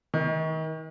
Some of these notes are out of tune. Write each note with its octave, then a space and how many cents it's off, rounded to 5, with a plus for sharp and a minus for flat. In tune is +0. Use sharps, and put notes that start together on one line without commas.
D#3 +35